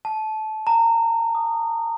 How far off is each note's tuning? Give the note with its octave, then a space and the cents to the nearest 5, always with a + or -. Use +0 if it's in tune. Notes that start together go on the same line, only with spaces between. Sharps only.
A5 -20
A#5 -25
D#6 -15